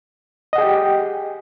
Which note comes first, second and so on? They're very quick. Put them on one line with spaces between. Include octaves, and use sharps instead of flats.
D#5 F#5 G#4 G5 G4